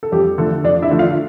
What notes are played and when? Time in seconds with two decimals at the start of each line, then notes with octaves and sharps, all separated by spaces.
0.03 A4
0.12 F2 G3 G4
0.38 D3 F3 A3 A4
0.64 F2 D4 D5
0.82 E4 E5
0.91 D3 F3 A3
0.99 F4 F5